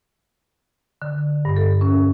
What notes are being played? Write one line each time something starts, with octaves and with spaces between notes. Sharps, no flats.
D3
G2
A4
C#4